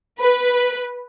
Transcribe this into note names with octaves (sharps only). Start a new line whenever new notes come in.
B4